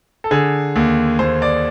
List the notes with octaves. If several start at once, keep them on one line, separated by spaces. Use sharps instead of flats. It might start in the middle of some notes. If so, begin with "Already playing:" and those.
A4
D3 G#4
D#2
D#2 C5
D5